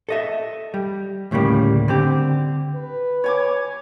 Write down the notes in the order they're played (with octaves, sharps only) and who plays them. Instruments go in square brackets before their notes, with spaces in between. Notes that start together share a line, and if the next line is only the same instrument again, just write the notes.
[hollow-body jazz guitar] A4 D#5 E5
G3
D2 A2 C#3 G3 A#3
D3 C4 G4
[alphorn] B4
[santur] C#5 G#5 D6